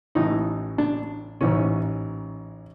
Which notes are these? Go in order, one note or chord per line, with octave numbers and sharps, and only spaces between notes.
A1 A2 E3 D#4
D4
A1 G#2 E3 C#4